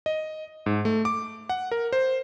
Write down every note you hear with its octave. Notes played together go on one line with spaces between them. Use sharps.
D#5
G#2
A3
D6
F#5
A#4
C5